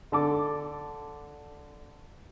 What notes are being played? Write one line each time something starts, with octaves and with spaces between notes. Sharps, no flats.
D3 A4 D6